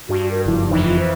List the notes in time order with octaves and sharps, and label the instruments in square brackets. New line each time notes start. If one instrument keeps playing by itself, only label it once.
[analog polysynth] G2 [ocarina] F#4
[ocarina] A#4
[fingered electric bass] F#1 F3 [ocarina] E4
[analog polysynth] F2 E3 [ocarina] D#4
[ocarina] F4
C5